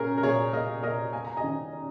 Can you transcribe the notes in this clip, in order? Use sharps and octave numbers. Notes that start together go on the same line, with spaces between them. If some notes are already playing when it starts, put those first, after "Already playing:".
Already playing: A#2 C#4 G#4 A#4
A#4
A#2 G#4 C#5
A#3 A#4 D#5
A#2 A#4 D#5
A#3 G#5
A#5
D#5 G#5
D#3
C#4